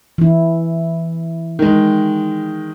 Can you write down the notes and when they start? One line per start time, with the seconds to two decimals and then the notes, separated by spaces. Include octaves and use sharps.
0.18 E3 E4
1.59 D#3 G#3